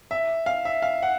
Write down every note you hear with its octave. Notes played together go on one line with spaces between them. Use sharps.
E5
F5
E5
F5
F#5